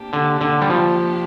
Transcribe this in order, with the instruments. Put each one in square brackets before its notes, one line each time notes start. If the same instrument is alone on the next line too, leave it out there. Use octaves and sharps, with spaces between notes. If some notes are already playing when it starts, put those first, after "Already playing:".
Already playing: [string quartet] C3 A#3 D4 G4
[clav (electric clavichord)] D3
D3
G3
F3